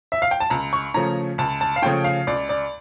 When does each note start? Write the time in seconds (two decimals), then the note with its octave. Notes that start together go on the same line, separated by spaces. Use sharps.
0.12 E5
0.22 F5
0.31 G5
0.40 A5
0.50 C#2 A#5
0.73 C#6
0.94 C#3 F3 A3 C#4 A#5
1.38 C#2 A5
1.61 A5
1.76 F5
1.82 C#3 F3 A3 C#4 G5
2.04 F5
2.27 C#2 D5
2.49 D5